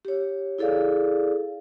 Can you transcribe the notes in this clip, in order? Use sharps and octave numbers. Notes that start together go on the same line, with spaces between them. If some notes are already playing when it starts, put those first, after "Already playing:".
G4 C#5
E4 G#4 A4 D5 F5